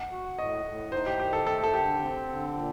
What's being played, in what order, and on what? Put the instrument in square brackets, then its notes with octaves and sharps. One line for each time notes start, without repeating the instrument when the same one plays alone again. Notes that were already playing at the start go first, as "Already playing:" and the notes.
Already playing: [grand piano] F#5
[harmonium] F#4
[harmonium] A2 [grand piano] D#5
[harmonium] A2
[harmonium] D#4 [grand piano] C5
[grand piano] G4
[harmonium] D#3 [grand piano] G4
[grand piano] A4
[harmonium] A3 [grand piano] A4
[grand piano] A4
[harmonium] D3 [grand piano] G4
[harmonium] C4
D3
A#2